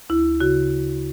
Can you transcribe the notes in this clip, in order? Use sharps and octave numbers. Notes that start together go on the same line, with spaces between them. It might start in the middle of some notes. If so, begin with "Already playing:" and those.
D2 E4
C#3 F#4